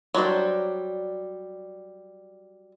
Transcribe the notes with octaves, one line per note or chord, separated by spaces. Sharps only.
F#3 G3 D4 C5